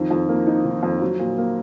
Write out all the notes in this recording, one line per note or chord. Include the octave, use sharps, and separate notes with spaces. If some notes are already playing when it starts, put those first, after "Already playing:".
Already playing: F2 D#3
F2
A#3
D#4
D#3
F2
F#3
A#2
A#3